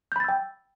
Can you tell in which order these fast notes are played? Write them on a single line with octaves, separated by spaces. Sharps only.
G6 B5 A6 E6 G5